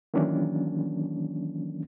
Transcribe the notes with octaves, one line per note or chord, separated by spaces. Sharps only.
D#3 E3 F#3 A#3 C#4 D4